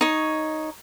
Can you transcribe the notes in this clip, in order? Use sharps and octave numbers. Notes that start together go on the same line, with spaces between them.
D#4 C#5